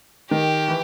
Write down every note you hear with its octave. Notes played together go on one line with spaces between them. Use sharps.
D#3 G4
E3